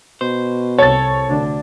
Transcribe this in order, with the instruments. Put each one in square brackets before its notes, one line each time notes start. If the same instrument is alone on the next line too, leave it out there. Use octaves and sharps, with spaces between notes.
[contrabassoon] B2 [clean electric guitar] C5
[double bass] C2 [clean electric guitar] A4 [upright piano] C#5 A6
[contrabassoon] D2 [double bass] D3 D4